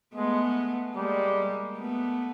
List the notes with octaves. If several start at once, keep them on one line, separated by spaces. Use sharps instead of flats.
G#3 A3 B3
G3 G#3 A#3
A3 B3